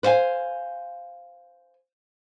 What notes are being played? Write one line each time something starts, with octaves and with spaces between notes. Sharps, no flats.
B4 C5 E5 F5 G#5